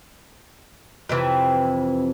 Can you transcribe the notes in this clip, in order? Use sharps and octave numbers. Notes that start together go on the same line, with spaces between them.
F2 C3 E3